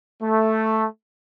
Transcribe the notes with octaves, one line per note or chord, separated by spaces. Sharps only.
A3